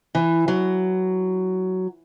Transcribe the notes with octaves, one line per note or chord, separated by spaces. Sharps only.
E3
F#3